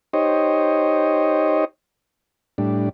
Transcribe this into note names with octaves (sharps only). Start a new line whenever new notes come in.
D#4 G4 C5 C#5 D#5
A2 G3 D4